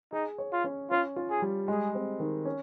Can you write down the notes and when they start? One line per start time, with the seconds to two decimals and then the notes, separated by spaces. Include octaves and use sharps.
0.12 D#4 G#4
0.38 C#5
0.52 F4
0.64 C#4
0.91 C#4 F4
1.16 F4
1.30 G#4
1.42 G3
1.68 G#3 G#4
1.95 C4
2.19 D#3
2.45 C#4